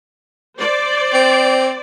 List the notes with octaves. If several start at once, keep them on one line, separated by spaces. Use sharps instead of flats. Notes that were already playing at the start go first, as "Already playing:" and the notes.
C5 D5
C4